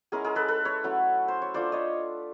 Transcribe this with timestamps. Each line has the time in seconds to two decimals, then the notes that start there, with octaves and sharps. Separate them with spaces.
0.12 G#3 C#4 E4 G#4 A#4
0.24 G#4 A#4
0.35 A4 B4
0.48 A4 B4
0.65 B4 C#5
0.84 F#3 A3 C#4 E4
1.28 C5
1.42 C#5
1.54 A3 D4 F4 C5 D5
1.72 C#5 D#5